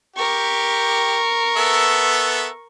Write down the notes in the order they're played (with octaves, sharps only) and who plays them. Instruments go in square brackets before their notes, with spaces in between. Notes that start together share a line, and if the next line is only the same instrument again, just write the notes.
[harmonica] G4 [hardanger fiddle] A#4 C#6
[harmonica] B3 A4 E5